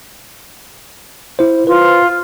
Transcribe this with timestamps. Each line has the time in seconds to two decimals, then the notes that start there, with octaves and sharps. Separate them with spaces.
1.39 E4 C5
1.67 F4 B4 C5